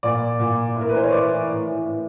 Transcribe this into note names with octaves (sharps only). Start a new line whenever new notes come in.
A#2 D5
A#2
A2
A#4
B4
E3 C5
C#5
A2 D5
E3
A2
E3
A2